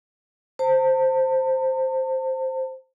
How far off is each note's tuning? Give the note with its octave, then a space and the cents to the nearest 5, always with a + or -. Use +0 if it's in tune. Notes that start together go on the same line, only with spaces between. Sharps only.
C5 +0 A5 +40